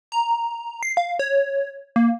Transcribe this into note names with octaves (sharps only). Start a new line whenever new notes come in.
A#5
C7
F5
C#5
A#3